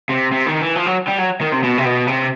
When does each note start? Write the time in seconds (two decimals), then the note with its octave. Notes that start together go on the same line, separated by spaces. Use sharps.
0.09 C3
0.32 C3
0.46 D#3
0.61 E3
0.76 F3
0.86 F#3
1.08 G3
1.19 F#3
1.41 D#3
1.52 C3
1.63 B2
1.78 C3
1.85 B2
2.07 C3